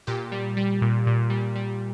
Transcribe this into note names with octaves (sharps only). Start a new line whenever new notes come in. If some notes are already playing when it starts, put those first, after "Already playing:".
A#2 G4
G3
G3
A#2
A#2
G3
G3